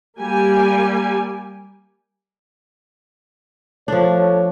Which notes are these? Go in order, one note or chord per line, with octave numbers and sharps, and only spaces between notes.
G3 A#3 G4 G#5
F3 A3 D4 A4 C#5